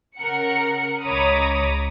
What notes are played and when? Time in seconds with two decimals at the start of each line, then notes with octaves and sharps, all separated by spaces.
0.17 C#3 A#4 F#5 C#7
1.02 C#2 C#5 A#5 B5 D6 D#6